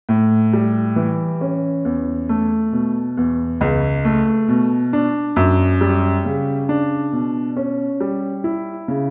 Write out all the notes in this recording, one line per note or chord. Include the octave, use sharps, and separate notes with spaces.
A2
G3
E3
C#4
E2
A3
B2
E2
C#2
A3
B2
D4
F#2
G3
C#3
D4
B2
C#4
G3
E4
C#3